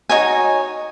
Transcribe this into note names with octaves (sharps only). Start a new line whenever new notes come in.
D#4 F#4 C#5 G#5